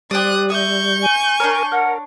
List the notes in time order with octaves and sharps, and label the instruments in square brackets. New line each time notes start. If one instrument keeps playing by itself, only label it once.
[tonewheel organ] G3 [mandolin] G4 C5 D5 [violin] D#6 F#6
[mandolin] E5 D#6 [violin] C#6 G6
[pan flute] G#5
[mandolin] D4 C#5 [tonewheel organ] A#4
[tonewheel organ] A#4 [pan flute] F#5